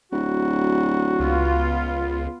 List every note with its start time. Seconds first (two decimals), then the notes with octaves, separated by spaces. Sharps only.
0.12 D1 F#4
1.20 C#2 B3 F4